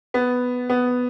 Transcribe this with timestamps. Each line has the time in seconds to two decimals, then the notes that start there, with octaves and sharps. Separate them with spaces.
0.14 B3
0.69 B3